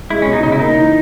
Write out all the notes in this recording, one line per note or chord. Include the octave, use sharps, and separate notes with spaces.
G#3 E4
B2 C#4
D#4
C#3 D#4
E4
A#3 D#4
E3